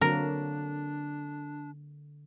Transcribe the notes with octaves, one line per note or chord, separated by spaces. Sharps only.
D3 F#3 A#3 C4 D4 A#4